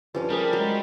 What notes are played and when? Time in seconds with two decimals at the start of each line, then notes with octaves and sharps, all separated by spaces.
0.15 G2 F3 C#4 C#5
0.30 G3 A3 G#4 A#4
0.53 F#3 G#3